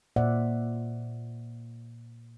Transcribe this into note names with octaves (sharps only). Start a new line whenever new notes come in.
A#2 C5 D5 E5 F#5